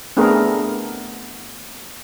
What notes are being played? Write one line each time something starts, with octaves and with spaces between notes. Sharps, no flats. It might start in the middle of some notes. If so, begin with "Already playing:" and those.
A3 B3 C4 D4 G#4 A#4